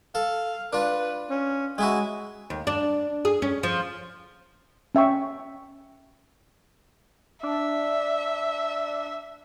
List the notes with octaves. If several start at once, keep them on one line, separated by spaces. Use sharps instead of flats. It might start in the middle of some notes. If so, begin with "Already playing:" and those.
A4 F5
D4 F4 B4
C#4
G#3 E4 F#4 G#5
D#2
D4
G#4
C#4
F3
C#4 E5 G5 C#6
D4 E5